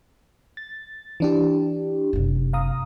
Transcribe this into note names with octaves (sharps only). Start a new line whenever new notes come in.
A6
E3 D4 G4
F#1 C3
F5 A#5 D#6